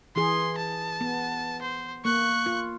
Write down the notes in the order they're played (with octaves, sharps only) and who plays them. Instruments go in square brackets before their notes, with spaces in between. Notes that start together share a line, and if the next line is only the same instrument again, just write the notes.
[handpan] E3 G#4 [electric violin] C6
[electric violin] A5
[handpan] B3
[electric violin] C5
[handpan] A#3 [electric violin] C#6 F#6
[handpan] F4